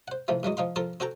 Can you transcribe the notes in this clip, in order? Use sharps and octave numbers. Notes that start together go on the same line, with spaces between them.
C5 F#5
A2 C3 E3 F3
G2 E3 F#3 G#3
F3 D#4 F5 C6
F3 F4 A4 A#4 A5
C4 F#4 A4 G5 A#5